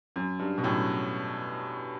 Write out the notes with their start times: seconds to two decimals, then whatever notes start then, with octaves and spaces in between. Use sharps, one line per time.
0.16 F#2
0.39 G2
0.58 B2
0.63 F#2 A2